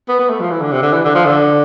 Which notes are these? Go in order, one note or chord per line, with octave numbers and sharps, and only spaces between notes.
B3
B3
A3
F3
E3
D3
C3
D3
E3
D3
F3
D3